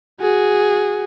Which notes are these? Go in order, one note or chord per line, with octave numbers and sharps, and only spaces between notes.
F#4 G#4